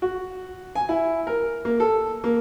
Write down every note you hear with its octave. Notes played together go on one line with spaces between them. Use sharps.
F#4
G#5
E4
A#4
A#3
A4
A#3